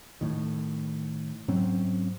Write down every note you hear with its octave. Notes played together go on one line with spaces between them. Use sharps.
A2 D#3
G#2 F#3 C4 C#4